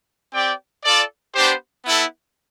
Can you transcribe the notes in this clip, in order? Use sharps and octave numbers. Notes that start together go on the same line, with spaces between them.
C4 G4 D5 G5
F4 A4 D5
B3 D4 G4 C5
B3 E4 A4